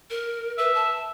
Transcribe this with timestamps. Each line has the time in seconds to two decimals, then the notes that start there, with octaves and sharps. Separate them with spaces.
0.10 A#4
0.58 B4 E5
0.75 A5